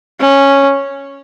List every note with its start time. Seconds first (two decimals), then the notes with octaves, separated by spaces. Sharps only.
0.20 C#4